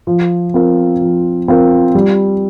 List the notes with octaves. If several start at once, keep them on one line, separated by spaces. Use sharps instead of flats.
F3
C4 F4 A#4
F3
C4 F4 A#4
G3